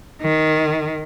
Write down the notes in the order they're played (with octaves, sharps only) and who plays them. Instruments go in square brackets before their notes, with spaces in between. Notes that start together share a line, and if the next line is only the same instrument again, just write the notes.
[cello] D#3